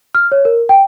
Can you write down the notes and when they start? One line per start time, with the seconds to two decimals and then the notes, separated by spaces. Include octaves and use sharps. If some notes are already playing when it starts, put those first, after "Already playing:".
0.15 F6
0.32 C#5
0.45 A#4
0.69 G5